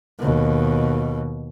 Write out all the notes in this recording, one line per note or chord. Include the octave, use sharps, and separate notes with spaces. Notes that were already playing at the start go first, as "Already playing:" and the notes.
D#2 B2